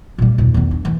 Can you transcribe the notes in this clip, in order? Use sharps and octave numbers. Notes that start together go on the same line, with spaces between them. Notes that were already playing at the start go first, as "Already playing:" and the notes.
A#2 G3
D#2 A#2
E2 D#3
D4
E3